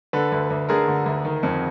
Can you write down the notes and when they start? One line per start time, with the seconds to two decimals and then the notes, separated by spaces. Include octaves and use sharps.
0.13 D3 A4 B4
0.32 D2
0.50 D2
0.69 D3 G#4 A#4
0.88 D3
1.06 D2
1.25 D#3
1.43 F2